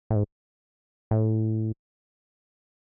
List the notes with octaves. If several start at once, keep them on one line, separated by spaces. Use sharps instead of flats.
A2
G#2
A2